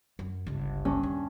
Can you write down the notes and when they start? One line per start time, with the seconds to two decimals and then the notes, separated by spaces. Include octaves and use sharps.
0.19 F#2
0.46 G1 C#2
0.85 G2 C#4
1.03 D#2